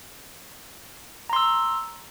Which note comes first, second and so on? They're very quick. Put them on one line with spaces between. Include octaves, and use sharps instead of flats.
A#5 C6 E6